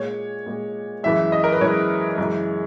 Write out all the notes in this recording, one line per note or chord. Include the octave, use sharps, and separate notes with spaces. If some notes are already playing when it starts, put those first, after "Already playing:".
Already playing: A#2 G#3 C#5
A#2 G#3
F#2 E3 G#3 E5
D#5
A#4
B4
F#2 E3 G#3 C#5
F#2 C#3 E3 G#3